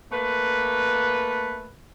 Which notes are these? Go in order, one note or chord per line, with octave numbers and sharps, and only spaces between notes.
A3 A#3 B4